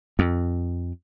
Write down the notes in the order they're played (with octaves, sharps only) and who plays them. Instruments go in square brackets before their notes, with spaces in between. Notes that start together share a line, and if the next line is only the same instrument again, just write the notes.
[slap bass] F2